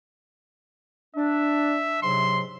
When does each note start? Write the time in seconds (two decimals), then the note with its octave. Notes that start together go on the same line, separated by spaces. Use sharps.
1.16 D4 E5
2.02 G#2 C3 F#3 C6